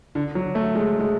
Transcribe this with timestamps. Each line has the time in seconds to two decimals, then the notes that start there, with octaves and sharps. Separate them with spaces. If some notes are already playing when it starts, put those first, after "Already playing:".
0.15 D3
0.35 F#3
0.55 A3
0.75 G#3
0.99 G#3